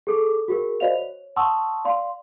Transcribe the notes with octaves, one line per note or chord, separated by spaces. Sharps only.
G#4 A4 D6
F#4 G#4 A#4
F#4 C5 D5 D#5 F5 F7
C#5
F#5 A5 C6 C#6 D#6 E6
D5 F5 C6